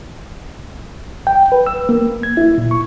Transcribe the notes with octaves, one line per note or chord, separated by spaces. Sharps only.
G5
B4
E6
A#3
G#6
E4
A#2
C#6